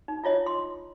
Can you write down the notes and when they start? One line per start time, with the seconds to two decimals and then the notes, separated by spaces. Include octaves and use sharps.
0.08 D#4
0.24 E4 F4 C#5 D#5
0.46 C6